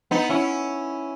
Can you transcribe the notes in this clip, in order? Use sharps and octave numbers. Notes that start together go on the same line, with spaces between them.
B3 D#4
C#4 E4